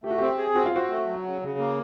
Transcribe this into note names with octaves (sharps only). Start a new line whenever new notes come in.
A3 G4
F#4
C4 G4
G#4
C4 F#4
F4
C4 F#4
A3
F#3
C#3
C#3
A#3